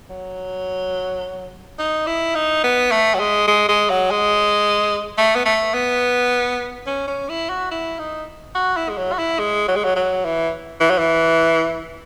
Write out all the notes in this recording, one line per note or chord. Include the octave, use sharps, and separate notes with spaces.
F#3
D#4
E4
D#4
B3
A3
F#3
G#3
G#3
G#3
F#3
G#3
A3
B3
A3
B3
C#4
C#4
E4
F#4
E4
D#4
F#4
E4
G#3
F#3
F#4
E4
G#3
F#3
G#3
F#3
F#3
E3
E3
F#3
E3